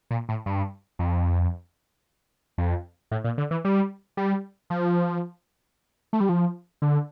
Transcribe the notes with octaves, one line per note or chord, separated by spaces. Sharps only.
A#2
A2
G2
F2
F2
A2
A#2
D3
E3
G3
G3
F3
A3
G3
F3
D3